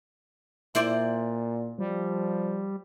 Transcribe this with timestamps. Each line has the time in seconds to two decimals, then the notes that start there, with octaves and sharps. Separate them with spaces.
0.75 A#2 E4 C5 D5
1.79 F3 G3